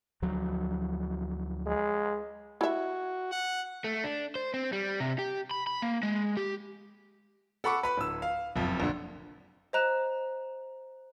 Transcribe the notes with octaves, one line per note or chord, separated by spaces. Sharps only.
D2 F3 F#3
G#3
E4 F#4 E5
F#5
A3
D4
C5
C4
G3
C3
G4
B5
B5
A#3
G#3
G4
A4 F#5 B5 C#6 D6
B4 B5
D1 E6
F5
F#1 F2
A#1 D3
C5 D#5 A#5 F#6 E7